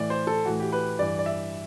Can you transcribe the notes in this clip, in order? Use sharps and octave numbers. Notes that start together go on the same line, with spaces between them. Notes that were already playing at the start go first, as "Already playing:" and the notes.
Already playing: A2 E3 D5
C5
A4
A2 E3 F#4
G4
B4
G2 E3 D5
D5
E5